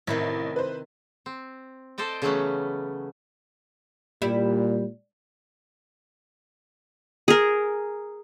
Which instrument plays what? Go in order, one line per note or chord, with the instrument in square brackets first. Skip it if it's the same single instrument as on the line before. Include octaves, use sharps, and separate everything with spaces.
[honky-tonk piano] A1 [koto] C3 D#3 E4
[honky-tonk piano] B4 C5
[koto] C4
A4 C5 D5 D#5 G5
C#3 E3 F#3 A3 B3 C#4
[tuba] A#2 [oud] G3 E4
[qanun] G#4 A#4